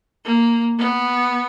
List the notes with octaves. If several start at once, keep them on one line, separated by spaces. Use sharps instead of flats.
A#3
B3